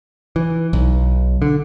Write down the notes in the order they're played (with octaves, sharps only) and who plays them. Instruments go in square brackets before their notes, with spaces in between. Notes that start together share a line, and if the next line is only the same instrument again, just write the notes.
[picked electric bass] E3
B1
D3